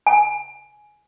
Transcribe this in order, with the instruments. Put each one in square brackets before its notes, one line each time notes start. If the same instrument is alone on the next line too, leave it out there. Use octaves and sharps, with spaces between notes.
[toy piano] G#5